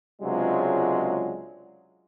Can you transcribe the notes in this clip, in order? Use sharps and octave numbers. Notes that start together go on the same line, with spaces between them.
C#2 C3 F#3 G#3 D4 F4